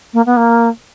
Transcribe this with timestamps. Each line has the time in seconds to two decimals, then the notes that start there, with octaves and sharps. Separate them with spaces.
0.13 A#3
0.26 B3
0.36 A#3